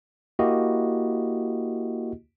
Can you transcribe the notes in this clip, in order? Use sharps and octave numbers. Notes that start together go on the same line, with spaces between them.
A#3 E4 F#4 G4 D#5